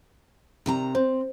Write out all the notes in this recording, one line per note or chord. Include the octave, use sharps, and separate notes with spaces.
C3 D#3 A#5
C4 C5